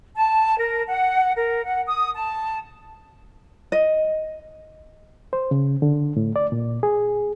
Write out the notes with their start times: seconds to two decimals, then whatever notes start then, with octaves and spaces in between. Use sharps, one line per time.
0.16 A5
0.58 A#4
0.88 F#5
1.37 A#4
1.64 F#5
1.87 D#6
2.14 A5
3.72 D#5
5.33 C5
5.51 C#3
5.82 D3
6.17 A2
6.36 D5
6.52 A#2
6.83 G#4